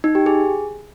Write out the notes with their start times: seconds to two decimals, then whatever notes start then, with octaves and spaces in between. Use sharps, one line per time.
0.04 D#4
0.15 G4
0.26 G#4